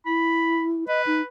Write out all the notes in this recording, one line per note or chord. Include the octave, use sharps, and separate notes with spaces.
E4 B5
B4 D#5
D#4